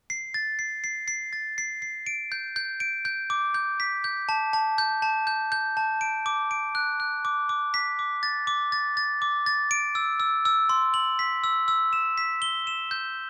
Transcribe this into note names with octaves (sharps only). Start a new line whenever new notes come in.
C7
A6
C7
C7
C7
A6
C7
C7
D7
G6
G6
D7
G6
D6
G6
B6
G6
A5
A5
G6
A5
G6
G6
A5
D7
D6
D7
F#6
F#6
D6
D6
B6
D6
A6
D6
A6
A6
D6
A6
D7
E6
E6
E6
C6
F#7
B6
E6
E6
E7
B6
G7
E7
G6